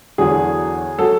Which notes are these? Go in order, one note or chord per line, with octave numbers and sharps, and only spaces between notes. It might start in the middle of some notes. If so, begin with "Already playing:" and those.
E2 D3 F#3 G#4
F#3 A4